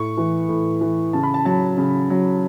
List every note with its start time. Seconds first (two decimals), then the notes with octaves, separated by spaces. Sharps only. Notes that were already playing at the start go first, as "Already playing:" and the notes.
Already playing: A2 C#6
0.17 E3
0.49 A2
0.81 E3
1.13 C#3 A5
1.23 B5
1.34 A5
1.45 F#3 A5
1.78 C#3
2.10 F#3